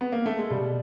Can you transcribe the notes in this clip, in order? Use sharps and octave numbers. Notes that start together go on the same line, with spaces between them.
B3
A#3
A3
G#3
B2 G3